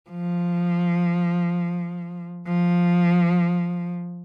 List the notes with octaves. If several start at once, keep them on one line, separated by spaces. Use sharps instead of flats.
F3
F3